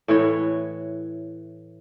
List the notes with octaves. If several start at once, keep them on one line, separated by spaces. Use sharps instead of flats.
A2 E3 C#5